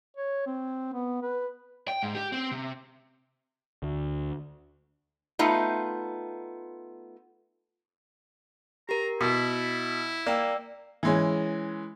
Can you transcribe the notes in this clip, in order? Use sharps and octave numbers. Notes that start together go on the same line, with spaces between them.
C#5
C4
B3
B4
G5
G#2
G4
C4
C3
D2
A3 B3 D#4 F4
G4 A#4 A#5
B2 E4 B6
A#3 D5 G5 E6
E3 G#3 C#4